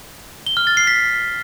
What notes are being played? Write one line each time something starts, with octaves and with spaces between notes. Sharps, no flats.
G7
F6
A6
C7
B6